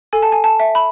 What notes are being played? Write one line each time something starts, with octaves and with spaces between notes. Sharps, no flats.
A4 G#5
A5
G#5
A5
E5
B5